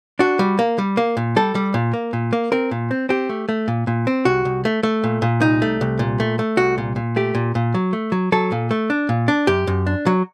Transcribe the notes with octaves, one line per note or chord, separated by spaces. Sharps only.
D4 F#4
G3
A#3
G3
A#3
A#2
G3 A4
G3
A#2
A#3
A#2
A#3
C4 A#4
A#2
C4
C4 G4
A3
A3
A#2
A#2
C4
C2 F#4
C2
A3
A3
A#2
A#2
C2 D#4
A3
C2
A#2
A3
A3
C2 F#4
A#2
A#2
A3 G4
A#2
A#2
F#3
A3
F#3
F#3 A4
A#2
A3
D4
A#2
D4
F#2 G4
F#2
D4
F#3